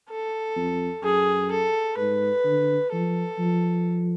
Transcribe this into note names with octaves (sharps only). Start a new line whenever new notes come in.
A4
F2
F#2 G#4
A4
G#2 B4
D3
F3 A4
F3